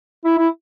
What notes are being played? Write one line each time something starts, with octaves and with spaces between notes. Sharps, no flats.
E4
E4